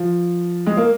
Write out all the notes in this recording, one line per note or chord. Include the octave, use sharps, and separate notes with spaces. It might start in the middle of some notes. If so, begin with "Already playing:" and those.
Already playing: F3
G#3
A#3